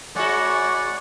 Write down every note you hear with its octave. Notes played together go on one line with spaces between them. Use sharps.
G#3 F#4 C#5 D5 F#5 G#5 B5